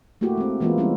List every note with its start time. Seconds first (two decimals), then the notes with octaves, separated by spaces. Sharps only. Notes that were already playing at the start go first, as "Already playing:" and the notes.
0.21 A3 A#3 E4 F#4 G4
0.37 G#3 C4
0.60 E3 G#3 A#3 B3 E4 F4
0.78 G3 G#3 B3 C#4 E4